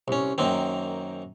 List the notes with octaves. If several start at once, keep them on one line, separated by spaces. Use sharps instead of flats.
C2 C#4
F#2 D#3 A#3 C4